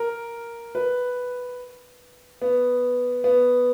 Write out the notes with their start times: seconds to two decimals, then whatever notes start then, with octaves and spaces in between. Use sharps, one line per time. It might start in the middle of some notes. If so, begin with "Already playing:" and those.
Already playing: A#4
0.75 B4
2.42 B3
3.24 B3